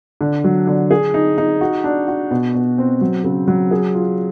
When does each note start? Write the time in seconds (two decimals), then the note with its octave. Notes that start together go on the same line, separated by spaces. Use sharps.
0.21 D3
0.44 F#3
0.67 D3
0.91 G#4
1.14 D#4
1.38 D#4
1.61 F#4
1.84 D4
2.08 F#4
2.31 B2
2.54 B2
2.78 C4
3.01 F#3
3.24 C#3
3.48 F#3
3.71 G#4
3.94 F4